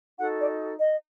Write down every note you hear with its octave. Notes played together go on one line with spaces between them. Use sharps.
D#4 F#4 A4 F#5
D5
D#5